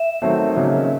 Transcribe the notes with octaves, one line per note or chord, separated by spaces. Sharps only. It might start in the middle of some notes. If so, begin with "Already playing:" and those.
Already playing: E5
D#3 F#3 A3 C4
C#3 F#3 A#3 D#4